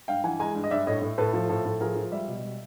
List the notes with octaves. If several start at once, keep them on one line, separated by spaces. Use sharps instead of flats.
G2 F5 G5
E3 F#5 G#5
G#3 G#5 A#5
G2
D#5
G2 D5 E5
A2 C#5 D#5
A2
A2 A4 B4
F3 A4
A2 A4
A2
F3 G#4 A#4
F3
G3 D5 E5
B2
G3